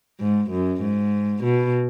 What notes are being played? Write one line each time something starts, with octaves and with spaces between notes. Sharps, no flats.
G#2
F#2
G#2
B2